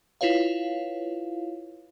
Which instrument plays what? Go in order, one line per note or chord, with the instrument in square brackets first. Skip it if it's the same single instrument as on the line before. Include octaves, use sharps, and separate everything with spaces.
[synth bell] E4 F4 B4 C#5 F5